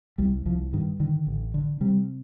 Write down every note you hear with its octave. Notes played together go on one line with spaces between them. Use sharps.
C2 G3
C2 F3
G2 D#3
D3 D#3
A1
D3
C3 G3